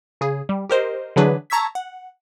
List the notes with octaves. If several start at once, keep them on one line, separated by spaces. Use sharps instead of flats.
C#3 G#4
G3
G4 A#4 C5 D#5
D3 E3 F#3 D4 G#4 B4
A5 A#5 C#6 E6 G#6 B6
F#5